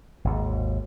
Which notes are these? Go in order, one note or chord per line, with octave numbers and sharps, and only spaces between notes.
G#1 D#2